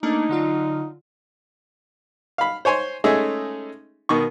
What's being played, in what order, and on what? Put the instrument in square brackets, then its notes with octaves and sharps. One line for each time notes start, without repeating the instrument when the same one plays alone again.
[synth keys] A3 A#3 D4 [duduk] D#4
[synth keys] D3 F#3 F4
[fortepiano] F5 B5
C5 C#5 G#5 C6
G#3 A3 C#4 D#4 G#4 E5
B2 D#3 C#6